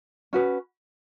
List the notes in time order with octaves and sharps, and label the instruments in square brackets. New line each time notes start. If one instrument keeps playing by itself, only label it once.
[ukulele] C#4 F#4 B4